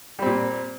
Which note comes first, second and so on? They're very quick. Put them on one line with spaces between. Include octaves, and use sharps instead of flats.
G3 C4 A#2